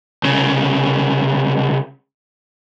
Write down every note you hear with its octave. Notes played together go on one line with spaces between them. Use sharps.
C2 C#3